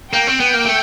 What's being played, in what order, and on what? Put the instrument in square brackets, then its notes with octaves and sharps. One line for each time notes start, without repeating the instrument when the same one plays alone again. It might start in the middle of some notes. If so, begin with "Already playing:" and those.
[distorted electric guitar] A#3 [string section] G5
[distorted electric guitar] C4
B3
A#3
A3